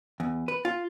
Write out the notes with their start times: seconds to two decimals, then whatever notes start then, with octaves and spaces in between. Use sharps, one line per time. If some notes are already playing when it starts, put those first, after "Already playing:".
0.20 E2
0.48 B4
0.65 F4